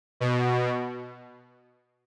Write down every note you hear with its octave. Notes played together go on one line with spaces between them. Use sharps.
B2